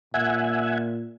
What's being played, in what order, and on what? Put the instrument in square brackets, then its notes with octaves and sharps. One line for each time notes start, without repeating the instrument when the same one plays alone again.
[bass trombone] A#2 [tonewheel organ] E5 F#5 G#5